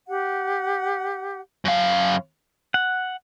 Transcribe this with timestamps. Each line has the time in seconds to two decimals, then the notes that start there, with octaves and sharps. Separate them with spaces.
0.07 G4 F#5
1.65 F#2 F5
2.74 F#5